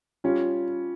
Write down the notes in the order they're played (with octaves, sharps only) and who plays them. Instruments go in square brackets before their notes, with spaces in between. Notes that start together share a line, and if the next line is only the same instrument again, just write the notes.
[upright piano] G3 C#4 [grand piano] F4